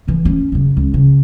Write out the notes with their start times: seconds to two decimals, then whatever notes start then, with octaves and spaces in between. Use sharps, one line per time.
0.07 D3 E3
0.25 C#4
0.52 F#2 C#3
0.77 C#2
0.94 C#3